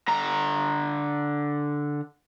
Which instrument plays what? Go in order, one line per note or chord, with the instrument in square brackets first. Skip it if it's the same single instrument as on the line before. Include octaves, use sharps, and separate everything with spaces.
[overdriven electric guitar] D3 A#5